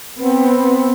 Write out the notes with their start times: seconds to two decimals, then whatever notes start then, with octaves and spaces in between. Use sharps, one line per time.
0.19 B3 C4